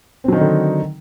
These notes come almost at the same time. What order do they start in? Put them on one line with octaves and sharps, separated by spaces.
C4 F#3 D#3 D#4 D3